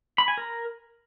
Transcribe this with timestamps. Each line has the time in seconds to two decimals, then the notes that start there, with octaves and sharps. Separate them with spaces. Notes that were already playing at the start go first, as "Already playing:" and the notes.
0.18 B5
0.28 G#5
0.37 A#4